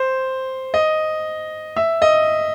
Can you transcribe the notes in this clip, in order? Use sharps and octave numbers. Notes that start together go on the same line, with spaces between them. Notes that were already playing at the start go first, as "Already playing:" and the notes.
Already playing: C5
D#5
E5
D#5